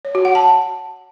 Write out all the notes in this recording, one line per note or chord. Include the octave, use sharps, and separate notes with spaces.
C#5
F#4
F#5
A5